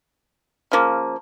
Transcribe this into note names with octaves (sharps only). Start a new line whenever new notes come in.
C#3 F3 A#3